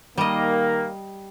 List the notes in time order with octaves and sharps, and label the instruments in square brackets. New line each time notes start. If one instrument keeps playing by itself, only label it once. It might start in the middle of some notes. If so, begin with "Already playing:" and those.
[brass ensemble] D#3 A#3 [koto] G3 D#5